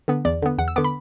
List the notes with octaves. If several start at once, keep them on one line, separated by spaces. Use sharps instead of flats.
D3 B3
E2 D5
D3 B3
E2 F#5
E6
D3 B3 D6
B5